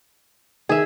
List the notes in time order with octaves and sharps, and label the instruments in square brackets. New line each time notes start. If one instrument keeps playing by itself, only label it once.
[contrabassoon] D#3 [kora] G#4 E5